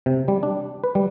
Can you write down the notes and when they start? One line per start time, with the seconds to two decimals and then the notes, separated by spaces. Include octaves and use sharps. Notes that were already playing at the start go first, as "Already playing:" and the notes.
0.06 C3
0.28 G3
0.43 D4
0.84 B4
0.95 G3